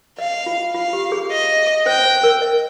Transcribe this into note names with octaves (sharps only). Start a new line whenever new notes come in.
D#5 F5
F4
F4 F5
G4
G#4
D#5
C5 G5
C5
A#4
D#5